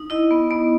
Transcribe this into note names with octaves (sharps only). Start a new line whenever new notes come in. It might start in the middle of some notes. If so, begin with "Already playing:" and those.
Already playing: D#4
E4 D#5
B3
B3